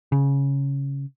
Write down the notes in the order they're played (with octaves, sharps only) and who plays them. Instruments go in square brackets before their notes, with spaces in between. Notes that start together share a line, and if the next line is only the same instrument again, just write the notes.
[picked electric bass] C#3